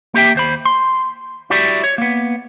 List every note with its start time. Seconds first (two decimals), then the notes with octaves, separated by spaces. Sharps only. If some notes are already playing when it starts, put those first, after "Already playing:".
0.14 A#3 G4 E5 G5
0.35 D#2 C5 B5
0.65 C6
1.50 E4 F#4 G4 D5 E5
1.84 C#5
1.98 A#3 B3